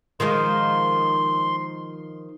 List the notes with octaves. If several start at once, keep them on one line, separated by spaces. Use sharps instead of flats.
D#3 F3 G#3 C6